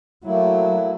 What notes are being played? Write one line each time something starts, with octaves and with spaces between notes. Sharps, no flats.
F#3 A3 A#3 E4